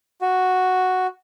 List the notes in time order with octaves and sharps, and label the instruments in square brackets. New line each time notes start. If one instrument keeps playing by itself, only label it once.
[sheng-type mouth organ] F#4